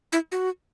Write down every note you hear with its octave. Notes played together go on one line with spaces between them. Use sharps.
E4
F#4